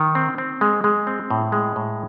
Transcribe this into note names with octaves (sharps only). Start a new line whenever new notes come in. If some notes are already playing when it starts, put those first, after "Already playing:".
Already playing: D#3
C4
C4
G#3
G#3
C4
A2
G#3
A2